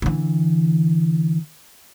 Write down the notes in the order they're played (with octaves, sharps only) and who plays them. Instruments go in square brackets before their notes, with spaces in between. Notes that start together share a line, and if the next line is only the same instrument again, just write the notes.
[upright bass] D3 E3